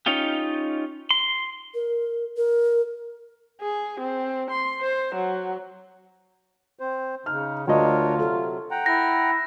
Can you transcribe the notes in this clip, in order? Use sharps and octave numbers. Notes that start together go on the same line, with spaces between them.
C#4 D#4 F4 G4
C6
A#4
A#4
G#4
C4
C6
C5
F#3
C4 C5
C#3 D#4 F6
D2 D4 F4 A#4 C#5 D#5
C3 F#3 A4
F#5 G5 A#5
E4 A#6